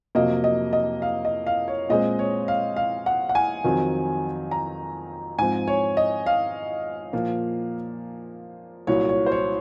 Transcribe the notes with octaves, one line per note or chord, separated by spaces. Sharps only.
F2 C3 F#3 A#3 D#5
D#5
D#5
F5
D#5
F5
C#5
A#2 G#3 C4 D#5
C#5
F5
F5
F#5
F#5
G#5
F2 D#3 F#3 C4
A#5
G#2 F3 C4 G#5
C#5
D#5
F5
A#2 F3 A#3
C2 A#2 F#3 C#5
C#5
C5
C#5